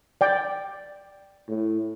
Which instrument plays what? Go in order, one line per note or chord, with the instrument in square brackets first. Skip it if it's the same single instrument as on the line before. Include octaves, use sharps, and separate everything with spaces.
[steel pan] D5 G5
[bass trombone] A2